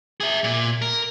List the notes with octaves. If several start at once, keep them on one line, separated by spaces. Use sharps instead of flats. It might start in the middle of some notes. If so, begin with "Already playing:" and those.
G#4 E5
A#2
A#4